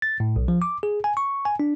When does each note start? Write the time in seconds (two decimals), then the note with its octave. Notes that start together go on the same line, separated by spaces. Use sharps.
0.02 A6
0.20 A2
0.36 B1
0.48 F3
0.62 D6
0.83 G#4
1.04 G#5
1.17 C#6
1.45 G#5
1.60 D4